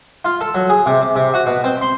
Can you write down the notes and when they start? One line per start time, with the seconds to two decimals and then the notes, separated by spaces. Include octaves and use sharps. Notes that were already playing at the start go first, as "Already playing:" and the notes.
0.25 F4
0.41 A4
0.55 F#3
0.69 G#4
0.86 C3
1.02 D6
1.16 C3
1.34 F#4
1.46 B2
1.64 C4
1.81 C6